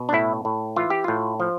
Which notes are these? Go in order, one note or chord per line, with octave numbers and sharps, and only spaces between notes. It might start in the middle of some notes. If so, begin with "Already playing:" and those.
Already playing: B2
D4
A2 E4
A2
E3 F4
G4
A2 F4
F3